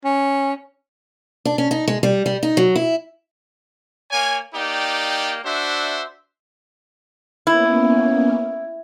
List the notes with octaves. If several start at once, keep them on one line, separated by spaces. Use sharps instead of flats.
C#4
D4
C#4
D#4
G#3
G3
G3
D#4
F#3
E4
A#3 C#5 G#5
A#3 D#4 G4 D5 G5
D4 F#4 C5 E5
A#3 B3 C#4 E4